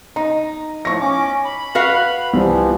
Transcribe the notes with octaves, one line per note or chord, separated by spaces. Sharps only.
D#4 A#5
A2 F3 C#6 A#6
C#4 D6
B5
F#4 B4 F5
C2 E3 F3